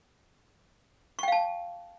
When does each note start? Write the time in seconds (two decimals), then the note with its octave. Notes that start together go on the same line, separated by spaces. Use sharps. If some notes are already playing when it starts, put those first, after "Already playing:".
1.19 C#6
1.23 G5
1.28 F5
1.32 A5